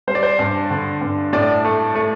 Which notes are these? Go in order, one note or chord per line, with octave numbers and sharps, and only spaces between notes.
G3 C5
D5
C5
G2
D3
G2
A2 D5
A3
A3